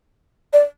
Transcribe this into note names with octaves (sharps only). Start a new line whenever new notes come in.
D5